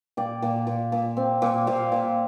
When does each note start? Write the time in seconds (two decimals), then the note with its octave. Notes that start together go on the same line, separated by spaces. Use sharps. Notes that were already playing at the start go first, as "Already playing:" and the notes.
0.17 A#2 D5 G5
0.42 A#2
0.67 A#2
0.92 A#2
1.17 C4
1.42 A#2
1.67 A#2 C5 F5
1.92 A#2